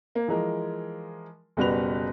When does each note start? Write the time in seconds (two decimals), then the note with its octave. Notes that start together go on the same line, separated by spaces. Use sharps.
0.15 A#3
0.28 E3 F3 G#3 A#4
1.57 F#1 B2 G3 F#4 B4 F7